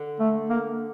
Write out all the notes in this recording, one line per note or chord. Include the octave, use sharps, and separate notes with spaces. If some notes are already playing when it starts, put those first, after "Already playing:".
Already playing: D3
A3
A#3